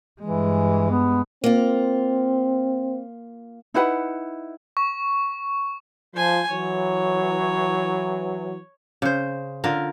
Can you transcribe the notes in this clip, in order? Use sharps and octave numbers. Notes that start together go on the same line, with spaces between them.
G2 E3 G#3
B3
A#3 C4 F4
D#4 E4 B4 F#5
C#6
F3 C5 G#5
E3 F#3 C#5
C#3 C5
D3 F4 A#4